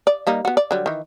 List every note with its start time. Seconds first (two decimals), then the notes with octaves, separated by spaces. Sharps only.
0.07 D5
0.27 G3 A#3 D#4
0.45 B3 F#4
0.57 D5
0.71 D3 F#3 G3
0.86 D#3 E3